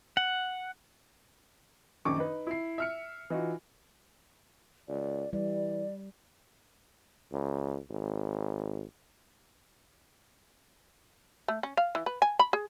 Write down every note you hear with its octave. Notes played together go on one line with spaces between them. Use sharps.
F#5
A#1 F#2 D#3 C#6 D6
D#4 B4
E4 C7
E5 F6 C#7
E3 D#4 F4 F#4
C#2 D5
E3 G3 D5
C#2
G#1
A3
C#4
F5
E3
B4
G#5
B5
G#4